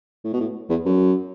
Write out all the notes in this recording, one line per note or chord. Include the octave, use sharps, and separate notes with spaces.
A2
B2
A2
E2
F#2